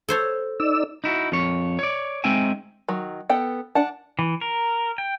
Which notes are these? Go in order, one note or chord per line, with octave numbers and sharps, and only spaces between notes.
A4 C5 C#5
D#4 D5 E6
D#4 E4 F#4
F2 C#5
C#5 D5
G#3 C4 D#4 E5 G5 G#5
D#3 F#3
B3 A4 G5
D4 F#5 A5
E3
A#4
G5